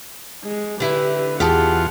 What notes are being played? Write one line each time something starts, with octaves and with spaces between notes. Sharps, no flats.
G#3
D3 E4 G4 B4
E2 F4 G4 G#4 F#5 A5